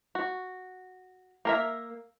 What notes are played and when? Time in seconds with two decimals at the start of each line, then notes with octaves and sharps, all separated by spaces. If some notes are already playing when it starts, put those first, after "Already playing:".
0.15 F#4
1.45 A#3 A#4 E5